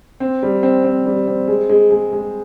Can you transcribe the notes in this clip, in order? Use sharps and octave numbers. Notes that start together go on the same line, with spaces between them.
C4
G3
C4
C4
G3
C4
G#3
G#3
G#3
G#3